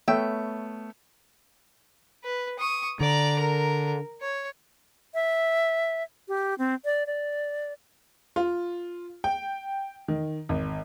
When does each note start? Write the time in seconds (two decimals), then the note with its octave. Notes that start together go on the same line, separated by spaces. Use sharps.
0.08 A3 B3 C#5 E5 G5
2.24 B4
2.59 C#6 D#6
3.00 D3 D5 A#5
3.40 A#4
4.21 C#5
5.14 E5
6.28 G4
6.58 C4
6.85 D5
7.07 D5
8.36 F4
9.24 G5
10.08 D#3
10.49 G#1